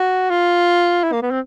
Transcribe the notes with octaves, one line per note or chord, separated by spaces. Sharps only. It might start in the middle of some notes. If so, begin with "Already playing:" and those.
Already playing: F#4
F4
E4
A#3
B3
C4